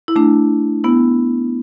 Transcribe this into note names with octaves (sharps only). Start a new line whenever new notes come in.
E4
A3 D4
B3 E4